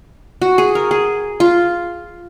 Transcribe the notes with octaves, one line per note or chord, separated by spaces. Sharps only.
F#4
G#4
A#4
G#4
F4